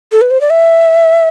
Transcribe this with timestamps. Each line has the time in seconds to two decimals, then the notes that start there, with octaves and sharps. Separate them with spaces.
0.12 A4
0.21 B4
0.31 C5
0.41 D5
0.50 E5